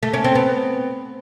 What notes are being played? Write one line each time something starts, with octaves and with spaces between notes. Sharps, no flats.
A3
C#4
C4
B3